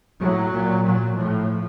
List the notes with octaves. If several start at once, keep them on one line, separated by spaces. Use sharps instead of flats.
A2 F#3
A#2
A#2 F#3
A2 F3